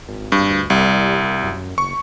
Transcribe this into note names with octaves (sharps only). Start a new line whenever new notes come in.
G#1
G2
D2
C2 G3
F#2
F#1 C#6